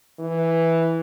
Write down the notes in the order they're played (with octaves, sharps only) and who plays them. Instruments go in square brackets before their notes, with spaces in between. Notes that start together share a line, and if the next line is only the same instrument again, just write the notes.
[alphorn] E3